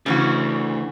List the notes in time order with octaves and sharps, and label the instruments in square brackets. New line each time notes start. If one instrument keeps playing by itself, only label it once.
[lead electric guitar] D2 [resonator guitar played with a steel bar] C#3 E3 F#4